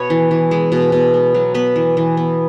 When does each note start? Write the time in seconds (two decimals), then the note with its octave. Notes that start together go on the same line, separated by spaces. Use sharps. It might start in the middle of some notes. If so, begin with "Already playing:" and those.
Already playing: B2 B3 B4 C#5
0.10 E3
0.31 E3
0.51 G#3
0.72 B2
0.92 B2
1.14 B3
1.35 F#3
1.54 B3 B4
1.76 E3
1.97 E3
2.17 B3